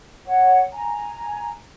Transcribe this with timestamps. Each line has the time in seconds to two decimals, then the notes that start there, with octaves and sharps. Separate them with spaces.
0.25 C#5 F#5
0.72 G#5 A#5